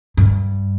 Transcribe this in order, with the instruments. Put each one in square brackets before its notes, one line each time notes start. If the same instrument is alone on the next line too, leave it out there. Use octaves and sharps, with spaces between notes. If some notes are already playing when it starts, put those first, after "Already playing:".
[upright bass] G2